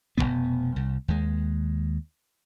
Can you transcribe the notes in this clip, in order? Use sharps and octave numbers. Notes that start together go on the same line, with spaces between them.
F1 F2 B2 B3
C2
D#2 G#3